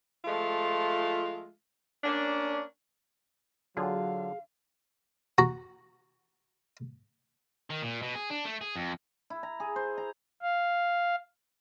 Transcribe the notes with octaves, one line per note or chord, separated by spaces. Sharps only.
F3 G#3 A3 F4
A#3 C#4 D4
D3 F#3 F4 G#4 F5
F#4 A#5
D#3
A#2
B2
G#4
D4
A3
G#4
F2
E4
A#5
G#4
C5
A#5
F5